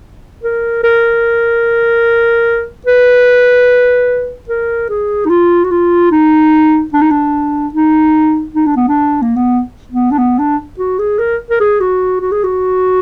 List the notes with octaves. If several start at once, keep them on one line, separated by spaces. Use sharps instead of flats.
A#4
A#4
B4
A#4
G#4
D#4
F4
F#4
F4
D#4
D4
D#4
D4
D#4
D#4
D4
B3
D4
A#3
B3
B3
D4
B3
D4
F#4
G#4
A#4
A#4
G#4
F#4
F#4
G#4
F#4